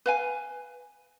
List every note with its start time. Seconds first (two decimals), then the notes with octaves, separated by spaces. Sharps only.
0.06 B4 F5 G#5